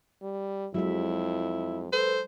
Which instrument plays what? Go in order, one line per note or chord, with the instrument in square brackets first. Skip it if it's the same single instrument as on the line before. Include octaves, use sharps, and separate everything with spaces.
[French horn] G3
[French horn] F2 [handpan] F#3 G#3 E5 [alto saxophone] E4
[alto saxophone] A4 [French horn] B4 [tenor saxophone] C5